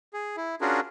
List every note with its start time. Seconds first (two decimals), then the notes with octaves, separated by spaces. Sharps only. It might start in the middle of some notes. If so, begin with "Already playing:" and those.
0.14 G#4
0.37 E4
0.61 C#4 D4 F4 F#4 G#4 A#4